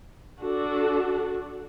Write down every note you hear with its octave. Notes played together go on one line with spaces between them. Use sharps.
D4 F#4 A4